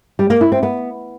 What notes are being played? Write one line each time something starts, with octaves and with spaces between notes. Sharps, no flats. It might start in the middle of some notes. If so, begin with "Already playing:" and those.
G3
A#3
E4
C4
B3